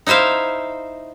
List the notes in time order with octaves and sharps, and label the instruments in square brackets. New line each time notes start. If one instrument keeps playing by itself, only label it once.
[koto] D#4 E4 C5 E5 F5